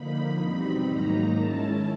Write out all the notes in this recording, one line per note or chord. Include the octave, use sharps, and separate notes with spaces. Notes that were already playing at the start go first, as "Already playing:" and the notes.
Already playing: D3 F3 A#3 D#4 B5
E2 B2 G3 C4 D#4
G#2 D#3 F#3 A#3 D#4 A#5
D#3 G#3 C#4 E4 A5